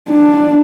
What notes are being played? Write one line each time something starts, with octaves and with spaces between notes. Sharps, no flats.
D4